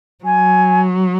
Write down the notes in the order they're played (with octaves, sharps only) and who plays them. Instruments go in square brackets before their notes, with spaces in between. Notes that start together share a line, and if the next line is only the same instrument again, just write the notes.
[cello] F#3 [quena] G#5